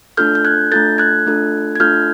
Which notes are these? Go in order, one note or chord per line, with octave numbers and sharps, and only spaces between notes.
A3 D4 F4 A4 F6 G6
G6
F#6 G#6
A3 D4 F4 A4 G6 A6
F#6 G#6
A3 D4 F4 A4
G#6
A3 D4 F4 A4 F6 G6